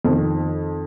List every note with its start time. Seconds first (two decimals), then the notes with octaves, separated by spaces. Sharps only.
0.05 F2 D#3